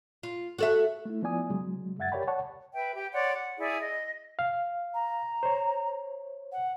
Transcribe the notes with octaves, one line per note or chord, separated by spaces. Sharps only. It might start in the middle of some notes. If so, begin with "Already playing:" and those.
F4
F#4 A4 E5
A3 E4
F3 B3 E4 D5 G#5 D#6
C#3 F#3 G#3
F#2 E5 F#5 G#6 A6
G4 A#4 C#5 D5 G5 B5
C#5 D5 F#5 A5 C#6
B4 E5 G5
G4 G5
C#5 D5 F#5 C6
F#5
E4 G#4 D5 E5
D#5
F5
A#5
C5 C#5
F#5